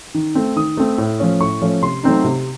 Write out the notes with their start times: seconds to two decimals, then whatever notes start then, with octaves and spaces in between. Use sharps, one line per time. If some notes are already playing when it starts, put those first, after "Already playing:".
0.14 D#3
0.35 A3 C4
0.56 D#3 D#6
0.77 A3 C4
0.98 A2
1.20 F3 A3 C#4
1.40 A2 C#6
1.61 F3 A3 C#4
1.82 C3 C6
2.03 F#3 A3 C4 D#4
2.24 C3